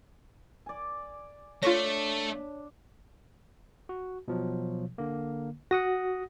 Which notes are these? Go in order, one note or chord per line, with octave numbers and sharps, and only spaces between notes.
D5 G#5
A3 D4 F4 C#5 A5 C#6 A#6
F#4
B2 F3 F#3
D3 A#3
F#4 F#5 D#6 A#6